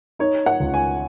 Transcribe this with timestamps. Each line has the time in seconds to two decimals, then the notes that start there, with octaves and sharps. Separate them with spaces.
0.19 D#4 C#5
0.46 F#5
0.60 C#2
0.74 G#5